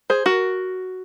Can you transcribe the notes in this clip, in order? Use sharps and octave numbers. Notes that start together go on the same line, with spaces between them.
G#4 C5
F#4 A#4